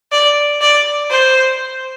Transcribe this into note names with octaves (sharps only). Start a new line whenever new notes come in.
D5
D5
C5